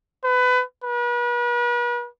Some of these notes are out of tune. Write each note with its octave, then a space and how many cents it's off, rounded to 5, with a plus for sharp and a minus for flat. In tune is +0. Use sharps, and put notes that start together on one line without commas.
B4 +25
B4 -40